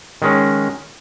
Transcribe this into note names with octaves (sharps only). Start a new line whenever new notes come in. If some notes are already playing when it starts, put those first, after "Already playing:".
D#3 G#3 C#4